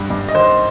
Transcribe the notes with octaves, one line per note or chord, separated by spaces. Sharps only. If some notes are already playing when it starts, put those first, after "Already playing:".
Already playing: G2
G2
D#5
D#3 C5